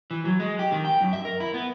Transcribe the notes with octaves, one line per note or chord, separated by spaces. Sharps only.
E3
F#3
G#3
G4
D#3
G5
F#2
E5
A#4
E4
B3